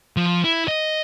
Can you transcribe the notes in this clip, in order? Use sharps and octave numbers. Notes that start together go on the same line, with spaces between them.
F3
E4
D#5